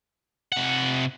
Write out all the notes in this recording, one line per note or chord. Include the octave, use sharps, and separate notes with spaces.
C3 F#5